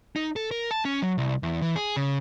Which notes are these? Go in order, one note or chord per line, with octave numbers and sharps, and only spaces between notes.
D#4
A4
A#4
A5
C#4
F#3
C2
E2
E3
G#4
C#3